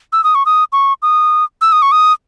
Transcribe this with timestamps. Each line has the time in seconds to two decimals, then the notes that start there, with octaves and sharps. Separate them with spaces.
0.13 E6
0.24 D#6
0.35 C#6
0.46 D#6
0.72 C#6
1.02 D#6
1.61 E6
1.72 D#6
1.82 C#6
1.92 D#6